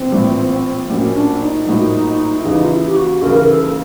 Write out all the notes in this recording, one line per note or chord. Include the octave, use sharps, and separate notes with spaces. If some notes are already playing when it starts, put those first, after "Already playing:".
Already playing: A#1 E3 C4
A#1 A2 E3
A#1 A2 F#3 A#3 C#4
D4
D#4
A#1 A2 F#3 A#3
E4
D#2 C#3 E3 D#4
F4
E4
G4
F#4
D#2 C#3 E3 A#4
A#4
A4